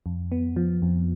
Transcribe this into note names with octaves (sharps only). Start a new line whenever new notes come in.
F2
B3
F3
F2